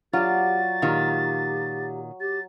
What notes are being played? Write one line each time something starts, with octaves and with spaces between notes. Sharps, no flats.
F#3 F4 G4 D5 A6
A#2 D#3 F4 G4
G4 A6